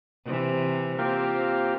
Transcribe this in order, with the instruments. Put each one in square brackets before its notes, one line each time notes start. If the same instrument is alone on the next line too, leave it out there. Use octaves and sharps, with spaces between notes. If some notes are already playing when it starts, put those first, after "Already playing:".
[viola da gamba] C3 E3
[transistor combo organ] A#3 F4 G4 [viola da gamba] C4